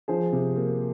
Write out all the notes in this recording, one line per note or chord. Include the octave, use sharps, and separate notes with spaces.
F3 G#4 C5
C3
A#3